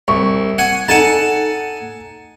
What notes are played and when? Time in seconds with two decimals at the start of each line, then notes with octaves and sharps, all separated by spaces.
0.08 C2 C#6
0.58 F#5 G#5
0.88 D#4 A4 F#5 G#5 A5